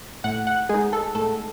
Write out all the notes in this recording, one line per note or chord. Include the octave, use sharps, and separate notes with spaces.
A2 F#5
F#5
G#3 D#4 G#4
A4
A2 A4